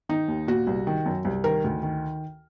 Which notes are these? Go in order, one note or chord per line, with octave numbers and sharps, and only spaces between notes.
D#3 D#4
D#2
A#2 F#4
C2
D#3
F#2
C2
D#3 A#4
D2
D#3